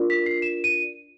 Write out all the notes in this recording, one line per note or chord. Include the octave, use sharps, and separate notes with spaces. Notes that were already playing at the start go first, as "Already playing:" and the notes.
Already playing: D4 F4 A#4 D5
B6
C7
E7
D#7